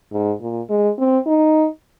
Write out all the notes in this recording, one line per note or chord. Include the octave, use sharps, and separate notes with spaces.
G#2
A#2
G#3
C4
D#4